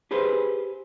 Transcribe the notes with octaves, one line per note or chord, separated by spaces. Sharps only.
G4 G#4 B4 C5